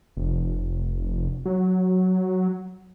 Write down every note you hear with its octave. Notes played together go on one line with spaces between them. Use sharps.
F1
F#3